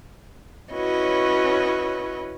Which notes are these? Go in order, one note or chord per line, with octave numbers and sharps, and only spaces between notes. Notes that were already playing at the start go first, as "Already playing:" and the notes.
C#4 E4 F#4 B4 C#5 D#5